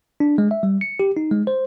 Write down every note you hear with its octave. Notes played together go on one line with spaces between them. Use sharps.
D4
G#3
E5
G3
C#7
G4
D#4
G#3
C5